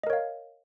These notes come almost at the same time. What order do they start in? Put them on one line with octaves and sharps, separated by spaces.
D#5 A#4 C#5 F5